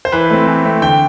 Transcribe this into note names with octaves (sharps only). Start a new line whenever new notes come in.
C5
E3 B4
A3 C4
E3
A3 C4
D3 G5